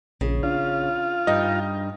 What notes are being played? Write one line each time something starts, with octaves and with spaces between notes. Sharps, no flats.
A#1 C#3
D4 F4
G2 D#4 D#5